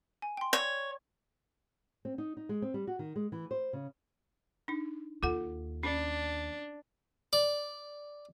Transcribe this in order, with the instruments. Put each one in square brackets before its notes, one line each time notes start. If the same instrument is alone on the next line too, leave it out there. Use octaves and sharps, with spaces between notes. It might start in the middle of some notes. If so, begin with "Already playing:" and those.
[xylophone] G#5
G5 C6
[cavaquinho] C#5 [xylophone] D5
[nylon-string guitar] C4
D#4
D#4
G#3
C4
G3
F#4
D#3
G#3
E3
C5
C#3
[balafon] D4 D#4
[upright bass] D#2 [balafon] F4 A4 F#5
[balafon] C#4 [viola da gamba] D4
[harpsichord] D5